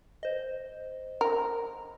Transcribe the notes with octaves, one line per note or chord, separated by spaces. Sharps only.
C5 D#5
A#4